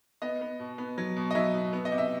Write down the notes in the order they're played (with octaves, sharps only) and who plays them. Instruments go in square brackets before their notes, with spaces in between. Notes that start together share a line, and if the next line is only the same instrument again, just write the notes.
[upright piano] B3 D#5
B3
B2
B3
F#3
B2
D#5
F#3 E5
B2
B3
D#5
C3
E5